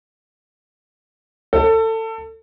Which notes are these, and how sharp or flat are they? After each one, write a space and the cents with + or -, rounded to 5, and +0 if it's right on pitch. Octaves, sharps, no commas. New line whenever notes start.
A4 +25